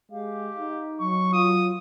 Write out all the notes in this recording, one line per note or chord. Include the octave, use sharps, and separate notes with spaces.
G#3 G4 F5
D#4
F#3 C#6
F4 D#6